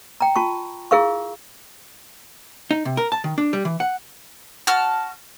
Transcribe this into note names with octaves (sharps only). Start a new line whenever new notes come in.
G5 A#5
F4 A5 C#6
E4 G#4 A#4 F5 C#6
D#4
C3
A#4
A5
D#3
D4
G3
E3
F#5
F#4 A5 F6